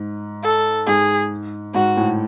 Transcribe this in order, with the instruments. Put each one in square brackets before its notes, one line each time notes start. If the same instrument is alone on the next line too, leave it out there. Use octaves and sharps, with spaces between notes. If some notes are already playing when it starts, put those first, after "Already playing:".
Already playing: [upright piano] G#2
[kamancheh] A4
[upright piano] G#2 [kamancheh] G#4
[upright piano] G#2 [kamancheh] F#4
[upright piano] A2